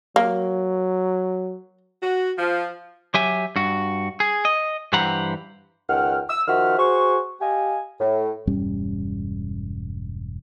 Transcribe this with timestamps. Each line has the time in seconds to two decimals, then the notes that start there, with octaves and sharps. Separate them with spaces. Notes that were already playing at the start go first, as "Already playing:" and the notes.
0.16 F#3 A#3
2.02 F#4
2.38 F3
3.14 F#3 G4 E5 G#5
3.56 G2 F#4
4.20 G#4
4.45 D#5
4.93 G2 E3 G4 C5 F#5 A#5
5.90 C#2 D#3 F#5 G5 F6
6.30 E6
6.48 D#3 F3 F#4 E5 F#5 F6
6.78 F#4 G#4 C5 C#6
7.41 G4 D#5 F5 G#5
8.00 A2
8.47 E1 G2 G3 C#4